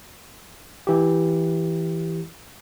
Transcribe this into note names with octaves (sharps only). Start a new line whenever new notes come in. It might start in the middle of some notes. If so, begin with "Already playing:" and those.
E3 G4